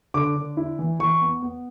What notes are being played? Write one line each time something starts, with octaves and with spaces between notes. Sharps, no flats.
D3 D6
D3
E4
E3
E3 C#6
B3
B3